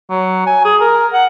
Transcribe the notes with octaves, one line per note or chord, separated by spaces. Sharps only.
F#3
G#5
G#4
A#4
F#5